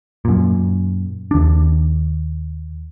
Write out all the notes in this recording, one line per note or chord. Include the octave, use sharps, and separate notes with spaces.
F#2 A#2
D#2 D4